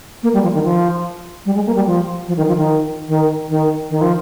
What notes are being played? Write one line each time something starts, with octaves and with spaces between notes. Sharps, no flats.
A#3
G3
F3
D#3
F3
G3
G#3
A#3
G3
F3
F3
D#3
F3
D#3
D#3
D#3
D#3
F3